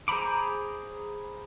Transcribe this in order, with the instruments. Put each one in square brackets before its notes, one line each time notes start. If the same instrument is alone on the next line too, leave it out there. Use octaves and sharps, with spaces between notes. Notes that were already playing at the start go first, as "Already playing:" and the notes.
[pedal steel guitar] G#4 C5 A#5 B5 D6